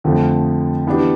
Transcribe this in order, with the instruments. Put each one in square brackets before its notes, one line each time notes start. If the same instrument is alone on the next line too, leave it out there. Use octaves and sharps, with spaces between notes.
[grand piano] F2 D3 F3 A3
E3 B3 D4 G4